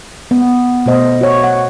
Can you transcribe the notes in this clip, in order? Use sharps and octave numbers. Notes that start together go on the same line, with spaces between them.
B3
B2 A3 C5 D#5
F#4 C#5
F#5